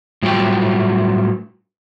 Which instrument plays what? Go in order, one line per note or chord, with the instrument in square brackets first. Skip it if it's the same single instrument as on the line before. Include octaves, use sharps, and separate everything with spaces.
[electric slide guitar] A2 F#3 G3 A3 F4 G5